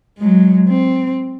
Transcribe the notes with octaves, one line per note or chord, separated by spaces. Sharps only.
F#3 G#3
C4